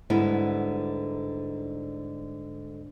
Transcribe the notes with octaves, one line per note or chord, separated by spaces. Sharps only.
G#2 D3 G3 B3 E4